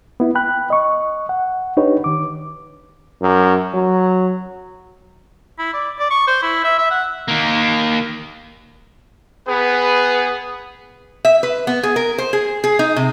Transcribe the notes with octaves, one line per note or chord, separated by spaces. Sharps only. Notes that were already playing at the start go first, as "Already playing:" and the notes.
B3 E4
G5 B5 F#6
D#5 C#6
F#5
D4 D#4 G4 B4 C#5
D#3 D6
F#2
F#3
E4
D5
D5
C#6
C5
E4
E5
E5
F#5
D#3 A#3
B3 G#4 B4
E5
B4
B3
G#4
A#4
C5
G#4
G#4
D#4
C3